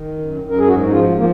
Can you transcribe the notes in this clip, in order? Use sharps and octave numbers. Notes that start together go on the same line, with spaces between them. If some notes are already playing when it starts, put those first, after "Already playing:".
Already playing: D#3
F#2
F#2
A#4
G#4
G#2 F#4
D#4
F3 F4
F3 A#3